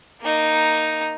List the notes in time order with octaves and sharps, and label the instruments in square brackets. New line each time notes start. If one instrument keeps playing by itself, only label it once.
[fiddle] A#3 D#4